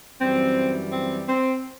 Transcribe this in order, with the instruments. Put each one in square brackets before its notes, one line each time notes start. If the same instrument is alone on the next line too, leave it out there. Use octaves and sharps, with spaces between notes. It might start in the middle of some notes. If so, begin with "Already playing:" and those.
[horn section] F#2 E3 G3 C4
C4
C4